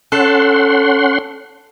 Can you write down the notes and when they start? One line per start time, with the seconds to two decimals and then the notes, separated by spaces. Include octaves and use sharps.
0.12 C#4 A4 F#5 C6